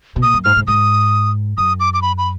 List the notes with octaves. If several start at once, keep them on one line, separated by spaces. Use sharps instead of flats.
B2
A#2 D#6
F#2
G#2 F6
G#2
G#2 D#6
F#2 D#6
D6
D6
B5
B5